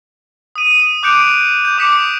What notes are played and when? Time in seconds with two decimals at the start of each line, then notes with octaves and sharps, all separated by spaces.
0.56 D#6 D#7
0.80 D#6
1.03 D6 F#6 G6 C#7 D7 F7
1.65 G6
1.78 D6 D#6 G6 B6 C#7 E7